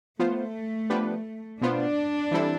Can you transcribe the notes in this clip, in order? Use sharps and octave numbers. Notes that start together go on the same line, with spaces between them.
F3 A3 B3 F4 C5
F3 B3 D4 G4 B4
B2 B3 D4 F4 C5
E3 G3 C4 E4 A4